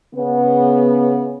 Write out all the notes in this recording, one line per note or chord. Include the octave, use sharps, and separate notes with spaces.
C#3 B3